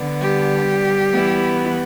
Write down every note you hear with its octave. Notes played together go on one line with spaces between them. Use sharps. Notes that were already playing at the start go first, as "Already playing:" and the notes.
Already playing: D3 B3
G3 G4
E3 B3 E4